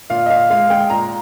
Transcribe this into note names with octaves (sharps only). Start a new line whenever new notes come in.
A#2 F5
D#5
A#2 F5
G#3 F5
G#3 G5
A#2 A#5